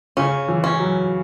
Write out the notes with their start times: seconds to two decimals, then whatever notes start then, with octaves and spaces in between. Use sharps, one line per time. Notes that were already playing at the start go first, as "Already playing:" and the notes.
0.17 C#3 C#4
0.48 E3
0.64 C#4
0.79 F#3